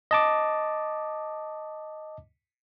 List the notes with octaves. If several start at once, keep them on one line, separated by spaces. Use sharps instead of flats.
D#5 A5 D6